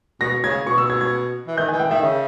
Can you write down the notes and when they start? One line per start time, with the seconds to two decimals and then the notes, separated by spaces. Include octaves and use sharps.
0.21 B2 A#6
0.44 C#3 G#6
0.66 B2 C#6
0.78 E6
0.90 G#6
1.01 G#6
1.47 E3
1.57 D#3 G6
1.68 G#5
1.72 E3
1.79 G5
1.88 D#3 E5
2.03 C#3